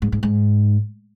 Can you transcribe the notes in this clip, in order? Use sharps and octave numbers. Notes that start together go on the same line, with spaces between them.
G#2
G#2
G#2